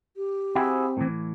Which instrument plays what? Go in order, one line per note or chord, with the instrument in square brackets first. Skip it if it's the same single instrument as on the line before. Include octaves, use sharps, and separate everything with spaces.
[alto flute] G4
[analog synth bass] C4 [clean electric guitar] E4 F#4 G#4
[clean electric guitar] A2 E3